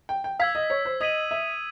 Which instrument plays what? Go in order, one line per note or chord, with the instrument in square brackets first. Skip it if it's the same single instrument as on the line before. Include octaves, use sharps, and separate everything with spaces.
[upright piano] G5
G5
[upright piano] F5 [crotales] E6 G#6 B6
[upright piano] D#5
C#5
C5
[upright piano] D#5 [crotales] D#6 G#6 B6 D#7 F#7
[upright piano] E5